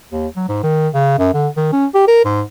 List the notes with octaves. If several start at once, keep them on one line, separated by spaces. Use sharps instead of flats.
D#2
F#3
G#2
D#3
C#3
F#2
D3
D#3
C#4
G4
A#4
G#2